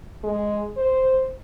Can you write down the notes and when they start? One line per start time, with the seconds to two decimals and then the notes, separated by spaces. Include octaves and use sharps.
0.24 G#3
0.77 C5